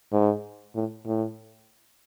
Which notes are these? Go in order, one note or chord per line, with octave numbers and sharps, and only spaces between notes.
G#2
A2
A2